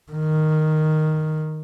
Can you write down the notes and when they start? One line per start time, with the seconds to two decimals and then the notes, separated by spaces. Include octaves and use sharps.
0.12 D#3